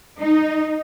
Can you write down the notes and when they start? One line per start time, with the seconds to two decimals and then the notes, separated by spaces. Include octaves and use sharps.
0.19 D#4